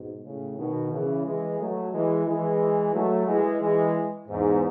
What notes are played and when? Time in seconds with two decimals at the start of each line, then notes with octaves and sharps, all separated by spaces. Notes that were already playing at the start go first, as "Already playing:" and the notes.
Already playing: G#2 B2
0.25 A2 C#3
0.58 B2 D#3
0.92 C#3 E3
1.25 E3 G#3
1.59 F#3 A3
1.92 E3 G#3
2.26 E3 G#3
2.93 F#3 A3
3.27 E3 G#3
3.60 E3 G#3
4.29 E2 G#2